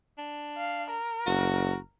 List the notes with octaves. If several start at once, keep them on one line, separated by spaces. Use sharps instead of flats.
D4
F5
A#4
F#1 F#4